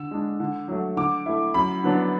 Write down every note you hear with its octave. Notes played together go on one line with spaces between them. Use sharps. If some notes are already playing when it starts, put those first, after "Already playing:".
Already playing: D3 E6
G#3 D4
D3
F#3 A3
D3 D6
A3 E4
F#2 B5
D3 F#3 B3 D4